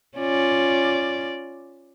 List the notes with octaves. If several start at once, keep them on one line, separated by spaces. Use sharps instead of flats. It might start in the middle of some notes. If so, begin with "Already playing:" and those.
C#4 F4 D5